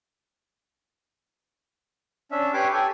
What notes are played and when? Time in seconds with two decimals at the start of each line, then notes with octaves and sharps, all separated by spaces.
2.31 C#4 D4 E5
2.54 G4 B4 C#5 C6 D6
2.73 G4 A4 G#5